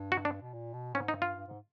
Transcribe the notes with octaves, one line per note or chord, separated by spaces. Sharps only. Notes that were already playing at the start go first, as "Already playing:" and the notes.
Already playing: G2
F#4
D4
B2
A#2
B2
G#2 C#4
D#4
G2
F4
G2
G#2